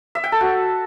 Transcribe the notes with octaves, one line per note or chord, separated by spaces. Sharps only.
E5
G5
A4
F#4